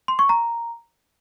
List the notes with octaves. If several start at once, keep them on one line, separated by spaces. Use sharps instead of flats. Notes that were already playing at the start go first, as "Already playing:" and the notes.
C6
C#6
A#5